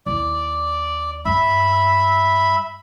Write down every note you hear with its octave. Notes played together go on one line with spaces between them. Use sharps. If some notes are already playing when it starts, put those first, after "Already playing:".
D#2 E4 D5
G2 E5 B5